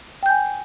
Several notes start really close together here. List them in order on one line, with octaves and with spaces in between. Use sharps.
G5 G6 G#5